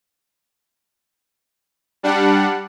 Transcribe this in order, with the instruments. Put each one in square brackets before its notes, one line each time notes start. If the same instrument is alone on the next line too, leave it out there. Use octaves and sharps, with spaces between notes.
[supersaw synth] G3 D4 F#5